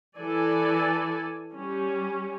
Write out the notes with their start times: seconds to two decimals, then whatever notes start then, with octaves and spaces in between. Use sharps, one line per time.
0.18 E3 A4 D5 G#5
1.54 G3 C#4